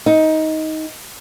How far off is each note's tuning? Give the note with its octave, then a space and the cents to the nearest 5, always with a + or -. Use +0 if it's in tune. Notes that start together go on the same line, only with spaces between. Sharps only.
D#4 +15